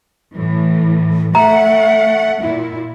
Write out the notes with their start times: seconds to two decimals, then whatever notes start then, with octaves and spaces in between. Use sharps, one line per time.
0.34 A2 E3
1.35 A3 E5 F#5 A#5
2.42 A#2 E4